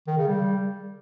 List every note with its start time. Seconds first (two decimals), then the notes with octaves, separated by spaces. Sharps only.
0.07 D#3
0.17 C#3
0.27 G3